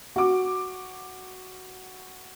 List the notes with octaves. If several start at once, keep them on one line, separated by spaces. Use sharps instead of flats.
F#4 D6